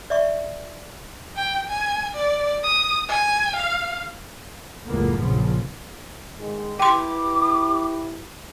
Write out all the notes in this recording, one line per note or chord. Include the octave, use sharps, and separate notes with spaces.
D5 E5 C#6
G5
G#5
D5
D#6
G#5
F5
F#1 C#2 A2 A#3 B3
A#1 C#3 F3
G#2 D#3 G#3
E4 G4 B4 G5 C6 D6